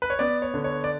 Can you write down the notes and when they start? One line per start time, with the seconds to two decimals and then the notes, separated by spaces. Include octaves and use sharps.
0.02 B4
0.10 C#5
0.19 B3 D5
0.42 C#5
0.54 D3
0.64 C#5
0.84 D5